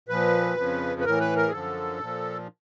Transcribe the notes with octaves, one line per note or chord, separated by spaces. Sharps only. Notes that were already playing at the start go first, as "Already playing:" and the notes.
A#2 F3 B4
F2 C#3 F3
B4
A2 E3 A#4
B4
A#4
G#4
F#2 D3 F3 A4
A#2 F3